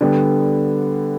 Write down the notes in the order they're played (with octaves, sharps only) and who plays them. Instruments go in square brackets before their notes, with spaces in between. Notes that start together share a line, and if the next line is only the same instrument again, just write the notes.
[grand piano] D3 G3 B3